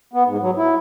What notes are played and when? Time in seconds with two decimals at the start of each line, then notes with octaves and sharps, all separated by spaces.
0.13 B3
0.26 G#2
0.42 F#3
0.56 E4